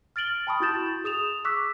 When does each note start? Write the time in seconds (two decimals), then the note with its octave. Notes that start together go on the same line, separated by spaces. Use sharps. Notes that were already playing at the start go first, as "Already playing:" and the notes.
0.16 F6 A6 D7 F#7 G7
0.47 G5 A5 B5 C#6 D#6
0.60 E4 F#4 G6 A6 E7
1.04 G#4 D#6 E7 F7
1.45 C#6 D6 E6 F#6 B6